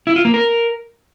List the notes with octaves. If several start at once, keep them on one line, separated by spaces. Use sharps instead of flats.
E4
F4
A#3
A#4